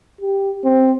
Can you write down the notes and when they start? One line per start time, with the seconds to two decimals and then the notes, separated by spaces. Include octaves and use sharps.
0.21 G4
0.64 C4